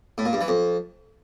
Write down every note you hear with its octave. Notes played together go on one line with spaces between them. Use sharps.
A2
A#2
G2
E3
F2